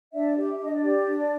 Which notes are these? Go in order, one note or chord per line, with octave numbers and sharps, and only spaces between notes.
D4 D5 E5
G4
E5
D4
D#5
D5
G4
D4